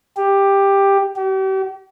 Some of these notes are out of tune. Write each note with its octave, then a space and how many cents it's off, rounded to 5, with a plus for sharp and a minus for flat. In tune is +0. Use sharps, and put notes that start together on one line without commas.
G4 +10
G4 -40